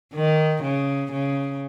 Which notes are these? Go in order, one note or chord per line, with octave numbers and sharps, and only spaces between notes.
D#3
C#3
C#3